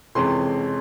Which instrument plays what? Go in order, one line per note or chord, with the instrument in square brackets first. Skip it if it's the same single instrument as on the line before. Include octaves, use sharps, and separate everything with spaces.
[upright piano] F2 C3 E3 G#3 C#4 C6